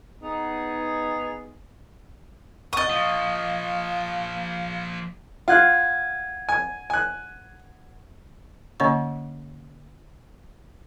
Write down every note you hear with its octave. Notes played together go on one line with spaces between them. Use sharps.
B3 D#4 G#4
D#5 F#5 C#6 D#6 A6
F3 A#3 F5
F4 F#5 F#6 G#6
G#5
G#5 F#6
D3 A#3 C#4 C#5 D#5 C#6